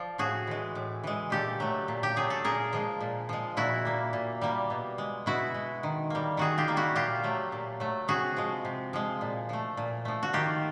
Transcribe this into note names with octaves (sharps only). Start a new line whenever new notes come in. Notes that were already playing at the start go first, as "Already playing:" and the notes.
Already playing: F3 D5
A2 F#4 G#4
E3 G#3
A2
E3 G#3
A#2 G4 A4
F#3 A3
A#2
G4
F#3 A3 G#4
A4
A#2 G#4 A#4
F3 G#3
A#2
F3 G#3
A#2 E4 F#4
G3 A#3
A#2
G3 A#3
B2
G#3
B2 E4 F#4
G#3
D#3
G3 A#3
D#3 F#4 G#4
F4 G4
G3 A#3
E4 F#4
A#2 F4 G4
F#3 A3
A#2
F#3 A3
C3 F#4 G#4
F3 G#3
C3
F3 G#3
A#2
F3 A3
A#2
F3 A3
F#4
D#3 F4 G4